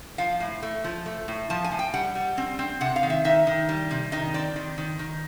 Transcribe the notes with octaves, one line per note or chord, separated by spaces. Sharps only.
F3 F5
A2
A3
F3
A3
A2
F3 A5
G#5
A2
G5
G3 F#5
G3
C4
C4
C3 F#5
F5
D#3
E5
D#3 E5
D#3
G3
C3
D#3 D#5
C4 D5
D#3
D#3
D#3